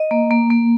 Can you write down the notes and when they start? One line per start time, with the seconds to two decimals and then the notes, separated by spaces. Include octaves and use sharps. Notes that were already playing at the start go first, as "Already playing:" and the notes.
Already playing: D#5
0.11 A#3
0.31 A#3
0.51 A#3